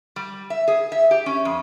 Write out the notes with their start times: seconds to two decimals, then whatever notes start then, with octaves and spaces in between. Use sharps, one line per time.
0.16 G3
0.50 E5
0.68 G#4
0.92 E5
1.11 G4
1.26 C#4
1.45 F2